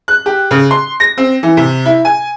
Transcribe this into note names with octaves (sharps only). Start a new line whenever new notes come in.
F#6
G4
C#3
C6
A#6
C4
E3
C3
E4
G#5